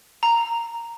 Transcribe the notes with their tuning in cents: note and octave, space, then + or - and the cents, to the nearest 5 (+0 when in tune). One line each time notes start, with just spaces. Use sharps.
A#5 -5